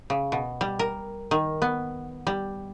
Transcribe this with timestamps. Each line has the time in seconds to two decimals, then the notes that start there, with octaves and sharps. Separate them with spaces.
0.10 C#3
0.32 B2
0.61 G3
0.79 A#4
1.31 D#3
1.62 B3
2.27 G3